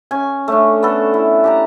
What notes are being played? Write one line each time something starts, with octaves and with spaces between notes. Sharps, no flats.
C#4 G#5
A3 C#4 D4
B3 A4
E4
G4 A5 A#5